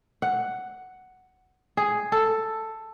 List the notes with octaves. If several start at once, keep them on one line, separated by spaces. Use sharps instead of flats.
F#5
G#4
A4